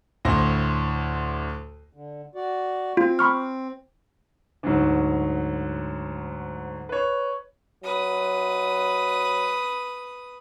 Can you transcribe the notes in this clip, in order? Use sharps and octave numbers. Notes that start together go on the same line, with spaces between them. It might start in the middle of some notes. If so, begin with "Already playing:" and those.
D2 A2 C5 C6 A#6
D3
F#4 D5
C4 F4
B5 C#6 F6
D2 G#2 F#3
B4 C#5
F#3 B4 D#6